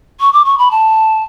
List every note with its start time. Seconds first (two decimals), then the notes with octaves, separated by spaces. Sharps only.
0.20 C#6
0.33 D6
0.45 C#6
0.58 B5
0.71 A5